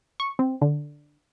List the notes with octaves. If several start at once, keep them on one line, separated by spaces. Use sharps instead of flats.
C#6
C4
D3